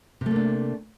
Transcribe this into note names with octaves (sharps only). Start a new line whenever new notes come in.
C3 A3 A#3 D4